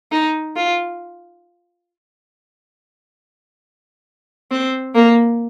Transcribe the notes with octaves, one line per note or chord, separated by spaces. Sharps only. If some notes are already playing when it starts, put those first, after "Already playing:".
D#4
F4
C4
A#3